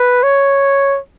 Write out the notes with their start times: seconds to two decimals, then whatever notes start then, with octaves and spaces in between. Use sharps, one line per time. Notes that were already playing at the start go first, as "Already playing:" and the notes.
Already playing: B4
0.23 C#5